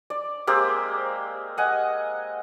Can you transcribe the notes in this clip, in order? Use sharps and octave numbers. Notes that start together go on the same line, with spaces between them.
D5
G#3 A#3 C4 G4
D#5 F#5 G#5